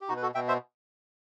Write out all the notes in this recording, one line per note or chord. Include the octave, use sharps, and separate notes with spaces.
G4
B2 D#4 F#4
B4
F#4 A4
B2 E5 G5
C5 E5